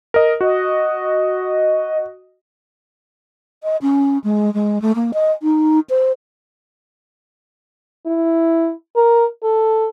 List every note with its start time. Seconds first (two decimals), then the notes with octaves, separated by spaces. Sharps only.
0.14 A#4 D#5
0.41 F#4 D#5
3.63 D#5
3.82 C#4
4.24 G#3
4.54 G#3
4.82 A3
4.95 A#3
5.14 D#5
5.42 D#4
5.90 C5
8.06 E4
8.96 A#4
9.44 A4